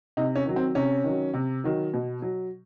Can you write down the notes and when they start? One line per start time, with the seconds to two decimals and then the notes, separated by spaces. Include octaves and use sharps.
0.17 C3 D#4
0.35 C#4
0.46 D#3 F#3
0.56 C4
0.75 C3 C#4
1.04 D#3 F#3
1.34 C3
1.64 D#3 F#3
1.94 B2
2.22 F#3